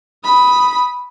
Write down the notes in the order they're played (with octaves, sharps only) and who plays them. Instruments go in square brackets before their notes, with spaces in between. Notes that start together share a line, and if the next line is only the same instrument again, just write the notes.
[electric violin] B5 D#6